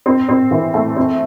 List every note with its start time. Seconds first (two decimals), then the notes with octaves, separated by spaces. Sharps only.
0.06 C4
0.29 C4
0.51 E3
0.74 A3
0.96 C4